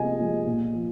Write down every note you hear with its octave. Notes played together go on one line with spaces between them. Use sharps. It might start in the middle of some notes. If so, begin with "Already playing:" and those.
Already playing: C3 F3 G#3 D#5 G#5
F3 G#3
A#2
F3